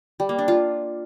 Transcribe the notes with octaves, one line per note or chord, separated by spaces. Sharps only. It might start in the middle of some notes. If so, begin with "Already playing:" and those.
G3
A#3
D4
F4